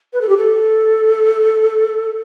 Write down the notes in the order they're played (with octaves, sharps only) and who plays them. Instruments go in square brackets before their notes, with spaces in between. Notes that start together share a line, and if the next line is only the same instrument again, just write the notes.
[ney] B4
A4
G4
A4